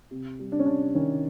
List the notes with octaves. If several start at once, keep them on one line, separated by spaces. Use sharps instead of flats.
C3
G3
D4
C#4
C3 D4
D#3 C#4